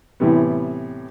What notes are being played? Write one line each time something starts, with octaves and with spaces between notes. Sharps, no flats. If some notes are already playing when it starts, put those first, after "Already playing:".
A2 C3 E3 G3 B3